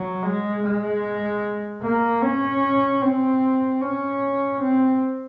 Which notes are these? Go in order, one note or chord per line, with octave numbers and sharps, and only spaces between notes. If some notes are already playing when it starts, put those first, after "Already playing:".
Already playing: F#3
G#3
G#3
A#3
C#4
C4
C#4
C4